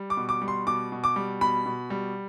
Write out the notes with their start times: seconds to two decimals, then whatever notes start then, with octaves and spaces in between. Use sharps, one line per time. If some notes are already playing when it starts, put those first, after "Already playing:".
Already playing: G3
0.10 D6
0.17 B2
0.29 D6
0.42 G3
0.48 C6
0.67 B2 D6
0.92 B2
1.04 D6
1.16 G3
1.41 B2 B5
1.66 B2
1.90 G3